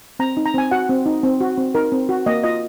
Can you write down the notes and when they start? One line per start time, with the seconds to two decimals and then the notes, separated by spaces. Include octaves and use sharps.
0.19 C4 A#5
0.37 D#4
0.46 A#5
0.54 C4 G#5
0.71 F#4 F#5
0.89 C4
1.06 D#4
1.23 C4
1.41 F#4
1.58 C4
1.75 D#4 A#4
1.92 C4
2.09 F#4
2.26 A#3 D#5
2.44 F4 D#5